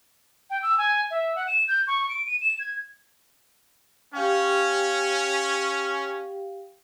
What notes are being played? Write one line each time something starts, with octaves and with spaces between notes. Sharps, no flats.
G5
E6
G#5
E5
F#5
E7
G6
C#6
D7
D#7
E7
G#6
C#4 G4 F5 G5